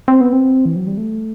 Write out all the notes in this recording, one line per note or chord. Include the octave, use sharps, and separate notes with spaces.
C4
B3
C4
E3
F#3
G3
A3